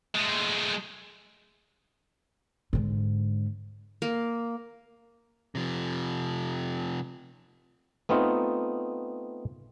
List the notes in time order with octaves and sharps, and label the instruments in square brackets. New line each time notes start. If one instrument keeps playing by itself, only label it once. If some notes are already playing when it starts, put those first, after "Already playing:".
[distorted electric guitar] G#3 A3
[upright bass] G#2 D3
[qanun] A#3
[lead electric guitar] C3 F3
[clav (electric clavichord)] A3 B3 C4 D#4 F4